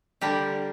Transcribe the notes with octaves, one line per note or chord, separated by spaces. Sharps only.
D3 G3 D4 G4 A#4